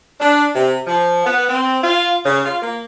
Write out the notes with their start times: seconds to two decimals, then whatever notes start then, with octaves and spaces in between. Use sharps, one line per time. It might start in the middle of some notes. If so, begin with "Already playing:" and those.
0.20 D4
0.55 C3
0.86 F3
1.25 B3
1.49 C4
1.83 F4
2.25 C#3
2.45 F4
2.62 A#3